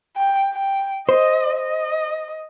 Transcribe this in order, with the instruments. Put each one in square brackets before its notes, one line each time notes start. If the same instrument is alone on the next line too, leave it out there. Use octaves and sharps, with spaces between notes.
[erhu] G5
G5
[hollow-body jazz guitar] C5 [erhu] D#5
[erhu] D#5